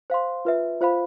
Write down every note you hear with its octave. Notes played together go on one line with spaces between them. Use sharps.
C5 F5 C6
F4 B4 E5
F4 C5 F5 B5